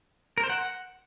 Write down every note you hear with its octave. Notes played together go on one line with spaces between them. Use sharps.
A#4
C5
F#5